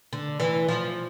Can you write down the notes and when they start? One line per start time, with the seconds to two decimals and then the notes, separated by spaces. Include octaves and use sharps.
0.13 D3
0.40 E3
0.69 F3